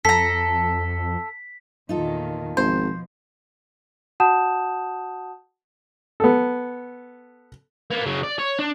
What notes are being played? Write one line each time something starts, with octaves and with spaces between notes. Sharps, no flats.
F2 A4 A#5 B6
E2 A#2 D#3 D#4 F4 A4
G#1 B2 F3 C5
F#4 F#5 A5 D#6 G6 E7
B3 A4
A#3 B3
C#3 F#3
D5
C#5
D4